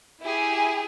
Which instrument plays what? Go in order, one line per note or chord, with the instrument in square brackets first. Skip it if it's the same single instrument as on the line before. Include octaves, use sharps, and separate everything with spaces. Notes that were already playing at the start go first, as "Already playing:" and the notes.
[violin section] E4 G4 G#4